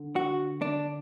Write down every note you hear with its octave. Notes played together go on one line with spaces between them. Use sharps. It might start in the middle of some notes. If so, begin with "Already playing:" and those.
Already playing: D3
F#4
D4